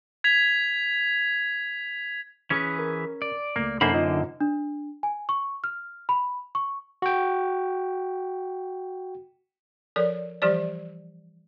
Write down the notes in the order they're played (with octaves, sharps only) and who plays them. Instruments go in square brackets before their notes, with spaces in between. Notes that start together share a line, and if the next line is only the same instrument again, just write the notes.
[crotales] G#6 B6 F7
[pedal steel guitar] E3 G#4 B4 [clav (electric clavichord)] C#4
[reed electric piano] A#4
[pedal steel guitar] D5
[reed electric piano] C#2 A3 [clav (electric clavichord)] A#3
[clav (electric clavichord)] F#2 A#3 C5 [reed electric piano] C3 D#4 A4 [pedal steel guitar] D4 B5
[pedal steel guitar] D3 [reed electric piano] D#4 F4 D#5
[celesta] D4
G#5
C#6
F6
B5
C#6
[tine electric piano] F#4 G5
[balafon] F3 A4 A#4 C#5 D5
E3 F3 G3 G4 C5 D5